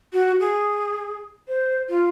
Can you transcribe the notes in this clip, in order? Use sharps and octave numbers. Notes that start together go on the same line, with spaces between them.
F#4
G#4
C5
F4